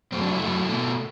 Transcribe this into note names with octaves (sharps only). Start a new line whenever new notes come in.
F#2 F#3 A3 C4
D4
E4
F#2 F#3 A3
B2 A3